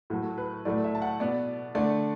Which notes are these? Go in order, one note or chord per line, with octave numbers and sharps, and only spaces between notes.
A2 F#3 A3 F#4
B4
A2 F#3 A3 D5
E5
A5
F#5
B2 B3 D5
D3 A3 D5